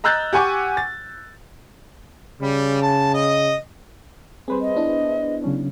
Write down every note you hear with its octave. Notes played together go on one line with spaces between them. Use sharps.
D#5 A#5 E6 F#6 G6 A6
G4 F#5 G#5 C#6 D6
A6
C#3 G3
A5
D#5
G3 C4 G#4 B4 C5
D#5
B3 D4 E4
C#3 F#3 C#4